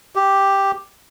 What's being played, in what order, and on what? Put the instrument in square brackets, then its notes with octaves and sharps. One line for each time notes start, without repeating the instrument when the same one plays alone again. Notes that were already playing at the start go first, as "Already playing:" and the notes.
[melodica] G4